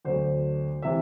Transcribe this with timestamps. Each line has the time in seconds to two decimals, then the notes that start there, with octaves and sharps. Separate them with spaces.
0.05 D2 D3 F#3 C5
0.82 C3 E3 E5